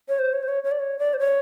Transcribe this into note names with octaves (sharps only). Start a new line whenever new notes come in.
C#5
C5
C#5
C5
C#5
C#5
D5
C#5
D5
C5
C#5